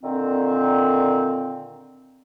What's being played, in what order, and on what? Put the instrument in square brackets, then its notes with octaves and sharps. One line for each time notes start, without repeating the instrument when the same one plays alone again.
[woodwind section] A#2 D3 D#3 C4